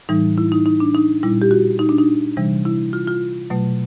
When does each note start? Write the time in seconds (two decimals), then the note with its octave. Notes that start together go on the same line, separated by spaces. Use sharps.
0.09 A2 E3 G3 D#4
0.38 E4
0.52 D#4
0.66 D#4
0.80 D4
0.94 D#4
1.23 A#2 G3 E4
1.42 G4
1.51 F#4
1.79 D#4
1.89 D4
1.98 D#4
2.37 C3 E3 G3
2.65 E4
2.93 F4
3.07 F4
3.50 B2 F#3 A3